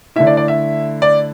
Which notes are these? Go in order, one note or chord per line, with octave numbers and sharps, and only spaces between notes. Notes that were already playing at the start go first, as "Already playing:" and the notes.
D3 A3 E4 E5
D5
D5
E5
D5